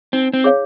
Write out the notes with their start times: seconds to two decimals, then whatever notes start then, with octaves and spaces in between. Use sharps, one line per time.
0.13 C4 D#4
0.34 C4
0.44 G#4 C#5 F5